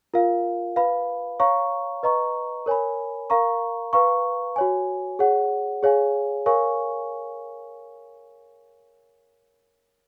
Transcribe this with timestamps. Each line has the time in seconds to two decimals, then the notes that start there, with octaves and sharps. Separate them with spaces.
0.14 F4 A#4 F5
0.76 B4 F5 B5
1.40 C#5 F5 A#5 C#6
2.03 B4 D#5 A#5 C#6
2.66 A#4 C#5 G#5 B5
3.30 A#4 F5 A#5 C#6
3.93 B4 F5 A#5 C#6
4.56 F#4 C#5 G#5
5.19 G#4 C#5 F#5
5.83 G#4 C#5 F5 G#5
6.46 A#4 C#5 F5 G#5 C#6